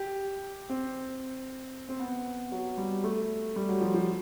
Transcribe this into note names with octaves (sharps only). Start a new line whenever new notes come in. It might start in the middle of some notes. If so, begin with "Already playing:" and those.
Already playing: G4
C4
C4
B3
F#3
G3
A3
G3
F#3
F3
F3